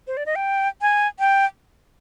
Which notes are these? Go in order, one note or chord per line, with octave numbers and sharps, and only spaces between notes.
C5
D5
D#5
G5
G#5
G5